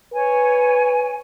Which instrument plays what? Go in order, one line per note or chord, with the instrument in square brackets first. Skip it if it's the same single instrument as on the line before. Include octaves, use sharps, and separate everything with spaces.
[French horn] B4 [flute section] C#5 G#5